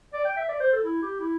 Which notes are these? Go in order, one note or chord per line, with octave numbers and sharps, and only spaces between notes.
D5
G5
E5
D5
C5
A4
E4
G4
E4